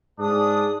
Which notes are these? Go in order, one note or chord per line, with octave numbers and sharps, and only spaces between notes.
G#2 D4 G#4 D#6